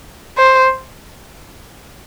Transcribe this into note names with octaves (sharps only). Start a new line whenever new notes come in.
C5